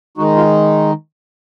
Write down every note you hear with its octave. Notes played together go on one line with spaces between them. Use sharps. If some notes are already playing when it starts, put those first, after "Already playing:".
D#3 G#3 D#4 F#4
F4